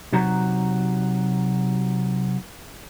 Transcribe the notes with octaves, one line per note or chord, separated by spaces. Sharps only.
C3 F#3 D#4 F#4 A#5